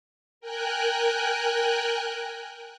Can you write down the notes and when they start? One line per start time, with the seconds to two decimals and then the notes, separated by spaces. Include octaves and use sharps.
0.41 A#4 G5 G#5 F#6